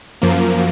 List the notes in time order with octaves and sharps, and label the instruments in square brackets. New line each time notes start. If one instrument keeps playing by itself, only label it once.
[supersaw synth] F#2 F3 A#3